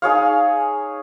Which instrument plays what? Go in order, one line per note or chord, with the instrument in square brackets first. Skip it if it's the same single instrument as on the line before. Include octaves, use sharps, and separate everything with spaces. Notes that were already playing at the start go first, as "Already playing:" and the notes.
[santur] D#4 G#4 C#5 F5